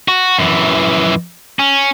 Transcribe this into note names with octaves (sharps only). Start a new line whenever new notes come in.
F#4
F#2 E3
C#4